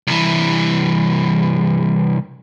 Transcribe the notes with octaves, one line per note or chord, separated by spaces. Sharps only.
C2 E3